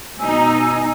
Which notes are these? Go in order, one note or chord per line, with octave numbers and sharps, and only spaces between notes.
B2 D#4 G#5 E6